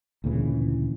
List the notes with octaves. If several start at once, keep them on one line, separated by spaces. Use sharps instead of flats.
D2 A#2 C#3 E3